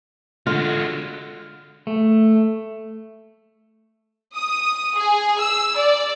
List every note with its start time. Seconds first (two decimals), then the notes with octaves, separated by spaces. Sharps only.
0.47 D3 G#3 F4 F#4
1.87 A3
4.36 D#6
4.96 G#4
5.40 E6
5.78 D5